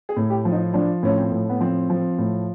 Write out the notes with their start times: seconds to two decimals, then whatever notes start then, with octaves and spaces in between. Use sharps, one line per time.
0.09 G#4
0.16 A2
0.30 G4
0.45 F3
0.52 D#4
0.73 F3 D4
1.03 A2 C#4
1.17 C4
1.32 A2
1.49 B3
1.60 F3 C4
1.90 F3
2.18 A2